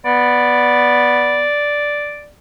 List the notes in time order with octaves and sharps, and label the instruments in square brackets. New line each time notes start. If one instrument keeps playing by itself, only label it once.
[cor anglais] B3 [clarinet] D5